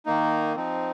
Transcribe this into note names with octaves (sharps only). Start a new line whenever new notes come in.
D#3 A#3 D#4
F3 C4 D#4